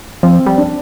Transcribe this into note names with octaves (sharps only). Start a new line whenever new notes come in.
F3 C4
G3
D4